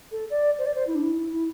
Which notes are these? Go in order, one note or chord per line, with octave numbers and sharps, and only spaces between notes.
A4
D5
C5
D5
C5
E4
D4
E4
E4